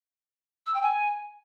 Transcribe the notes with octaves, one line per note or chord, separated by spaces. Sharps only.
E6
G5
G#5